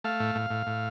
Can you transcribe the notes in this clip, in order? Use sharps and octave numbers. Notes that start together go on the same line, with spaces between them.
A3 F5
A2
A2
A2
A2